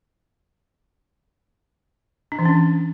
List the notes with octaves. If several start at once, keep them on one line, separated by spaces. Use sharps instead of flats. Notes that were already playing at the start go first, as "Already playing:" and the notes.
D4
E3
C#4